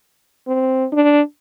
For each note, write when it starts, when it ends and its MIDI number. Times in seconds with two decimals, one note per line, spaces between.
0.48 0.85 60
0.92 1.21 62